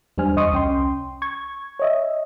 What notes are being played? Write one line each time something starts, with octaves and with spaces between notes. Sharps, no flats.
E2 G3 D4 C5 G#5 F6
E2 D#5 C6 C#6 D#6
C2 C#4 G5 C6
C#6 G#6
C#5 D#5 E5